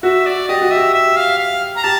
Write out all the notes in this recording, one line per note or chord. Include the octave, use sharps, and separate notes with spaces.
F#4 E5
D5
G4 D#5
F#4
G4 E5
E5
F5
F5
A#5
G4 A5